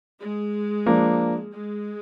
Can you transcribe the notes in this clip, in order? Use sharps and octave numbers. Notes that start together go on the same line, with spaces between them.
G#3
F3 A#3 D4
G#3